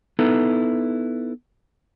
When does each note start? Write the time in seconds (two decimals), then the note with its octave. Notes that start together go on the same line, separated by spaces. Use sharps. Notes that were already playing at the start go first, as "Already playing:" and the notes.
0.19 B3 D#4 E4 A4 B4